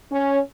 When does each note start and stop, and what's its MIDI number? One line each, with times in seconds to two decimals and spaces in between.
0.10 0.38 61